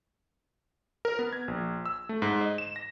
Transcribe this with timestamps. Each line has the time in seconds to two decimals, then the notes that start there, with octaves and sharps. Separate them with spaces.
1.05 A#4
1.19 B3
1.33 G#6
1.48 A#1
1.86 E6
2.09 A3
2.22 G#2
2.41 D#5
2.58 E7
2.76 A#6